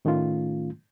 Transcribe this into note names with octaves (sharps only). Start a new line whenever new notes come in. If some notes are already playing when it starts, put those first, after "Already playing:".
A2 D#3 A3 C#4 F4